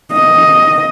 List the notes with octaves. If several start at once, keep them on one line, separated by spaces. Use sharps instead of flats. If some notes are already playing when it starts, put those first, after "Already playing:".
D#5